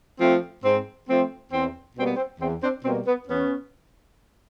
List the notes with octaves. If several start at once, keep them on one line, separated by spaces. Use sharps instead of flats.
F3 A3 C4
G#2 C4
F3 A3 C4
E2 C4
B2 G3 A#3 C4
B3
C4
E2 C4
C4 D4
B2 G3 A#3 C4
B3
E2 B3 C#4